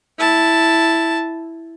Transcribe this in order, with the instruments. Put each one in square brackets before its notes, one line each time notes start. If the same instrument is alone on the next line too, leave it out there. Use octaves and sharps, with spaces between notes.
[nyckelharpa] E4 A5